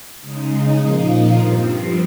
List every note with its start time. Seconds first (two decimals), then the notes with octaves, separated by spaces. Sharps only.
0.21 C#3 G#3 D#4
0.78 A#2 F3 A#3 D#4
1.35 G2 F3 C4